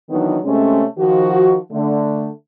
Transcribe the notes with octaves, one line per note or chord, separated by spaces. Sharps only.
D#3 E3 F#3 B3 D4 D#4
C3 G#3 A3 C#4
D#3 F3 F#4
D3 A3